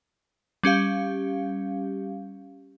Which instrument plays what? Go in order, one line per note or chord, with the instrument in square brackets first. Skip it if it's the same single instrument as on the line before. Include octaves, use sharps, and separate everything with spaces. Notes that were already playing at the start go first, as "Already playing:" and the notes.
[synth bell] G3 C#4 G4 F5